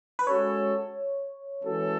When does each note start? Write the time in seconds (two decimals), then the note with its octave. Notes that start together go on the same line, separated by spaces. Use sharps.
0.19 B4
0.27 G#3 C#4 F#4 A4 C#5
1.63 E3 G#3 C#4 F#4 A4